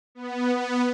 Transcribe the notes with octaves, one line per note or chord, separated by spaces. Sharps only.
B3
B3